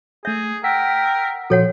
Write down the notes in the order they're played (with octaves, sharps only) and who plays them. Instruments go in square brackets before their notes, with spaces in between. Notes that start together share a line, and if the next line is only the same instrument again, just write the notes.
[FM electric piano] A3 G6 [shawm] G#4 [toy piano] E5
[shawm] A#4 [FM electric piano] F#5 E6 B6 [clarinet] G5
[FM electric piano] A#2 F3 F#4 [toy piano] A4 C#5 F#5